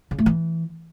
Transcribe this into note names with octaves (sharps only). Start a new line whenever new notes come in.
C#3
A3
E3